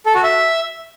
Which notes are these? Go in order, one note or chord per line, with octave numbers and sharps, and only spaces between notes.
A4
F#4
E5